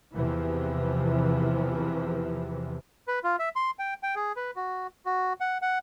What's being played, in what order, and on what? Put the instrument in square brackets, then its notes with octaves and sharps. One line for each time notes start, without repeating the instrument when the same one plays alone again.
[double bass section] E2 C3 E3 F3
[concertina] B4
F4
E5
C6
G5
G5
G#4
B4
F#4
F#4
F#5
F#5